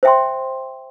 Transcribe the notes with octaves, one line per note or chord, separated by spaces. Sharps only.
C5 E5 G5 C6